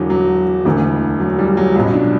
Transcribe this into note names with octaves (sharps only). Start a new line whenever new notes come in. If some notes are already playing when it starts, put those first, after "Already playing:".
Already playing: E1 E2 D3 F#3
F#3
E1 D2 D3
F#3
G3
F#3
C#2 B2 F#3
D4